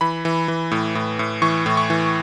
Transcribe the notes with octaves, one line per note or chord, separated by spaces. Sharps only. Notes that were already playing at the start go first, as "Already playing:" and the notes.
E3 B5
E3
E3
A2
A2
A2
E3 C#6
A2
C#6
E3